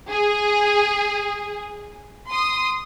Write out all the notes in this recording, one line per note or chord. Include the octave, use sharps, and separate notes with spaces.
G#4
C6 D#6